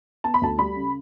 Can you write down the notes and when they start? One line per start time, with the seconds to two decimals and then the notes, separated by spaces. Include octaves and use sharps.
0.24 B3 A5
0.34 B5
0.41 D2 A5
0.58 G3 B5
0.76 C#3